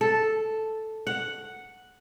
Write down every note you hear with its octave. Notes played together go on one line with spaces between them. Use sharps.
A4
F#5